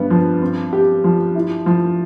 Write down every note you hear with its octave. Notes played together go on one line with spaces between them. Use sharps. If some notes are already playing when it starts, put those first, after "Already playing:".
Already playing: G2 B3
F3
C4
G4
F3
E4
F3